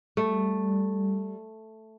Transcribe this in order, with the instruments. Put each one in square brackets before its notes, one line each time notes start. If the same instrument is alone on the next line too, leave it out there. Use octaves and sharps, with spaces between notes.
[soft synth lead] G3 [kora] A3